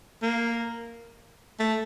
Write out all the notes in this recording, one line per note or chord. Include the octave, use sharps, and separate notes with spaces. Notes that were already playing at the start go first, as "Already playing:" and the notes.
A#3
A3